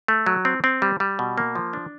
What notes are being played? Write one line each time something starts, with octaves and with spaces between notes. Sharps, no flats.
A3
F#3
C4
C4
G3
G3
B2
A#3
F3
D4